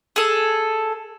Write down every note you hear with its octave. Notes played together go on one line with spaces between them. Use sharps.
G#4 A4